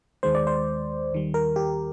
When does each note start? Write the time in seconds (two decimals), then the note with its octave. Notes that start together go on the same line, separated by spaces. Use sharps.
0.23 D#2 D#3 G#3 C5
0.35 D5
0.47 C5
1.12 D#2 D#3 G3
1.34 A#4
1.56 G4